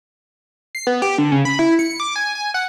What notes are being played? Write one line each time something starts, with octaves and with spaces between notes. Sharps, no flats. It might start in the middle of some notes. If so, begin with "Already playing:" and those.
C7
B3
G4
D3
C#3
B5
E4
C#7
D6
G#5
G#5
F#5